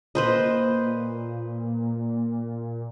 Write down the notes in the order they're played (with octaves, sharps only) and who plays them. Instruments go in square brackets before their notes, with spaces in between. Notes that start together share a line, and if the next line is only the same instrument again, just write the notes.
[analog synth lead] A#2 [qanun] B4 C5 D#5